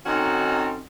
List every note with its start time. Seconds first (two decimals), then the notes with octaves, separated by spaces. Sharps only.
0.06 D#3 C4 C#4 D#4 F#4 A4